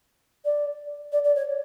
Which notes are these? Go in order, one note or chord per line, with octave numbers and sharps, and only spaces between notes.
D5
D5
D5
C#5